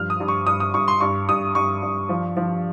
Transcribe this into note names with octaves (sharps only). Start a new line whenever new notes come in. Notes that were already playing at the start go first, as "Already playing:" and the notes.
Already playing: G2 F3 F6
D#6
G2
C#6
G2 D#6
D#6
G2 C#6
C6
G2 C#6
G2 D#6
G2 C#6
G2
F3
F3